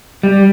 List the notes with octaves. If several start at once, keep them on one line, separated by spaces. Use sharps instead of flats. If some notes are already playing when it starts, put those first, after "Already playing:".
G3